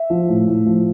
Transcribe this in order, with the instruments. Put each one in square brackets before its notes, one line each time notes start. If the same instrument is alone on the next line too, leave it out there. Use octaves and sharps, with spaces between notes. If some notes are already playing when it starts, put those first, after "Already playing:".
Already playing: [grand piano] E5
F3
A2
A2
F3